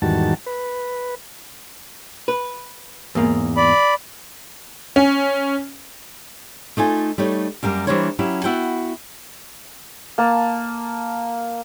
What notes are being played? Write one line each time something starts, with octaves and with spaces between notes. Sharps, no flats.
E2 G#2 D#3 G3 F#4 A5
B4
B4
E2 G#2 A#3
D5 B5
C#4
A3 D#4 F4 G#5
G3 A3 D#4 C#5
F#2 G3 A#3 A#4
E3 G3 A#3 D4 C5 C#5
F#3 C#4 E4 G4
B3 E4 F#4 F#5 G5
A#3 A5